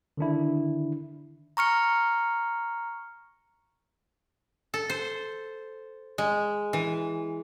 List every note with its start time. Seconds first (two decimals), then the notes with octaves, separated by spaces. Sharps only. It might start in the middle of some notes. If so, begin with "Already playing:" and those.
0.17 D3 D#3 D4 E4
1.57 A#5 C#6 F6 C#7
4.74 A4
4.90 C5
6.18 G#3
6.73 E3